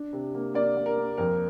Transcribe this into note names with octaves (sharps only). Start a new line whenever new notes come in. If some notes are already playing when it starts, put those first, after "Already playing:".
Already playing: D4
C3
A#3
A#3 D5
A#3
A#4
A#3
F2 A#4